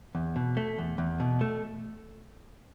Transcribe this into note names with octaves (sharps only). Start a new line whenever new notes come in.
E2
B2
A3
E2
E2
B2
A3